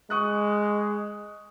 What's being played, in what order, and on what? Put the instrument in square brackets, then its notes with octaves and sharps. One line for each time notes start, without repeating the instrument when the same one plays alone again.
[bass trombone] G#3 [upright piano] C#6 D#6 F#6